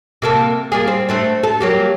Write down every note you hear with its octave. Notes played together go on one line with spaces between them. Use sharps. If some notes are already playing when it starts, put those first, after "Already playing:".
C3 A#3 A4
G3 A#3 G#4
C4
A3 C4 D4
A4
F#3 A#3 G4